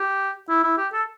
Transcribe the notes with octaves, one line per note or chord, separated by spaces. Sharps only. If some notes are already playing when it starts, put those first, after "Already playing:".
Already playing: G4
E4
E4
G4
A4